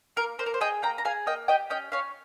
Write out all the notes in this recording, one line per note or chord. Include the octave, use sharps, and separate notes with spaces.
A#3 A#4
A#3 C5
A#4
C5
G#4 D#5 G5
A#3 G5 A#5
A#5
G#4 F5 G#5
A#3 D#5 G5
G4 D#5 G5
C#4 D#5 G5
C#4 C#5 F5